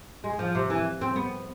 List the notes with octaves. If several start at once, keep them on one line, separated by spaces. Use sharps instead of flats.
G#3
F3
C3
E3
C4
B3